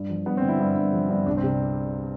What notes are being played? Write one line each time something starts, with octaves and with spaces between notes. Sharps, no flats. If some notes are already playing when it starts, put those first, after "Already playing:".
Already playing: G2
F3
G2 B3
C4
D3
E4
G2
G2
F3
G2
C2 D4
C4
C3